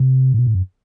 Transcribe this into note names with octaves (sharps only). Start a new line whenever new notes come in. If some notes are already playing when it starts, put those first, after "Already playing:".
Already playing: C3
A2
B2
A2
F#2